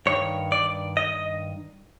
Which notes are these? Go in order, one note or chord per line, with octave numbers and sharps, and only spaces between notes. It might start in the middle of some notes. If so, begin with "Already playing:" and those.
G2 D#3 C#5
D5
D#5